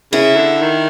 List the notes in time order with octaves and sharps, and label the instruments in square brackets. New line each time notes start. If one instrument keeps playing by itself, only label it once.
[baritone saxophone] C#3 [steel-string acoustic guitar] E4
[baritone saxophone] D3
D#3